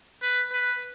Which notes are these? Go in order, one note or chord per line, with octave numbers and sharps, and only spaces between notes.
B4
B4